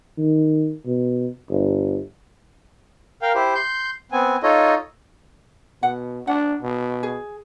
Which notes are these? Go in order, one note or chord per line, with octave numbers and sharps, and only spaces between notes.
D#3
B2
G1
A#4 F5 G5
E4 G4 C5
C6 G6
B3 C4 G#5
D#4 F4 A4 C#5 D#5
B2 F#5
D4 F#5
B2
G#4